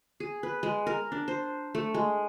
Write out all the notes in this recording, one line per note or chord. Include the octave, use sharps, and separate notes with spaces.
G#4
B4
G#3
A#4
D4
C5
A3
G#3